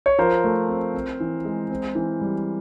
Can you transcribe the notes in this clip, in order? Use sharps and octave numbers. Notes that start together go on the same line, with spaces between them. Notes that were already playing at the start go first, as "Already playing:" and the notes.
C#5
F3 A#4 C5
A3
C4
C4
E3
G#3
C4
E3
G3